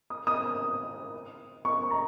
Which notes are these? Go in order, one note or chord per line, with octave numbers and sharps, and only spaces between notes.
D#6
D#6
C#6
A#5